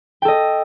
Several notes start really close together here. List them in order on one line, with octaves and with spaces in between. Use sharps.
G5 A4 D#5